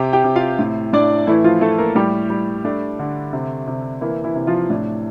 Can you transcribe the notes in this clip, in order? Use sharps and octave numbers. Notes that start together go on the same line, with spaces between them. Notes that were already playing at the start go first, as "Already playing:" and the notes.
Already playing: C3 G4 G5
G4 G5
C3
F4 F5
A2
A2 D4 D5
E3 A3 E4
F3 F4
A3 A4
A#3 A#4
A2 G3 G4
G3
A3 D4
D3
C3
C3
E3 A#3 E4
E3 E4
C3
F3 F4
A2 D4